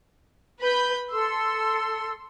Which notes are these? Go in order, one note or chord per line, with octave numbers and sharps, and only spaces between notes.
B4 B5 G6
A4 C6 E6